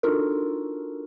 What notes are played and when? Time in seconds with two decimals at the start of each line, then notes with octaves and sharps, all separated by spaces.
0.03 D4 D#4 F4 F#4 A4 A#4